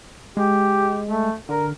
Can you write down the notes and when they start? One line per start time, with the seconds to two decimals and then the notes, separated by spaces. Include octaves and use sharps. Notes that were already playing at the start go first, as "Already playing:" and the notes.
0.37 G#3 G4
1.07 A3
1.49 D3 A#4